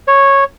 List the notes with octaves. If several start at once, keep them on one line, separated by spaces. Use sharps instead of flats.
C#5